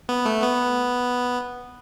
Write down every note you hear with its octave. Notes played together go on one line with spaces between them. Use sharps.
B3
A3
B3